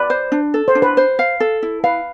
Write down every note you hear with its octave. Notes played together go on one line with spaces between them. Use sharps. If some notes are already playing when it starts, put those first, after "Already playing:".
Already playing: B4 D5
C5
D4
A4
C5
D4
B4
C5
F5
A4
E4
B4 F5